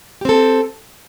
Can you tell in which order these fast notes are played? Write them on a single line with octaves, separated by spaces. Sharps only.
G4 C4 A4